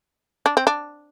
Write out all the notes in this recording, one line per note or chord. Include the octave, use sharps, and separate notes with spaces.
D4
C4
D4